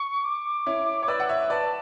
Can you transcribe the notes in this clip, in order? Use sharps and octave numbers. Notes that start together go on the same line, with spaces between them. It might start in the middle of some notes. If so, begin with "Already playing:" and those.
Already playing: C#6
D6
C#4 E4
C#5
B4 D5 E6
F#5
C#5 E5 E6
B4 D5 A5